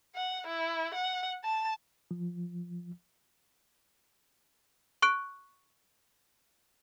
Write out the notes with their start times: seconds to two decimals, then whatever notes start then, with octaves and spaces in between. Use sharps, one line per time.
0.15 F#5
0.47 E4
0.94 F#5
1.44 A5
2.11 F3
5.02 C#6 F#6 D7